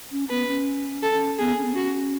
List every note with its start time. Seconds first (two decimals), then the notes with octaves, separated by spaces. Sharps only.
0.11 C#4
0.30 B3 B4
0.48 C#4
1.03 A4
1.39 B3 G#4
1.58 C#4
1.65 B3
1.73 C#4 F#4